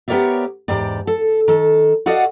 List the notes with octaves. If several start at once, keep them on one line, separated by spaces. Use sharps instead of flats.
B3 G4 A#4 C#5 D5 E5
E2 G#2 G4 D5
A4
D#3 A4
F#4 A4 D5 D#5 F5 F#5